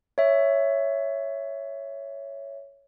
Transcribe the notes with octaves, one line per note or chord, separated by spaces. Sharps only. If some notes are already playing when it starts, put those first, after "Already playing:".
C#5 E5